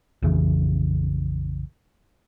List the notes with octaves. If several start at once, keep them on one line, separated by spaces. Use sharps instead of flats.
A#1 F2 C#3 E3